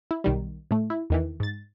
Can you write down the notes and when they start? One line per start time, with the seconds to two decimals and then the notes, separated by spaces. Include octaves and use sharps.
0.11 E4
0.24 B1 D#3 G3
0.71 A2 A3
0.90 E4
1.10 E2 D#3 E3
1.40 G#2 A6